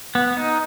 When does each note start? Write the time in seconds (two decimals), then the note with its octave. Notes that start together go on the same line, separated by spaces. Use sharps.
0.15 B3
0.37 D#4